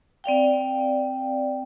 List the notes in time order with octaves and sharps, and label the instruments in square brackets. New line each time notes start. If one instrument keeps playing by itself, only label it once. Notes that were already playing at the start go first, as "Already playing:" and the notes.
[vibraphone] C4 D5 F5 G5